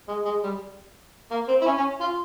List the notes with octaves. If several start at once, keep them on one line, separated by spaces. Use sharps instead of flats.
G#3
G#3
G3
A#3
C4
E4
C#4
C#4
F4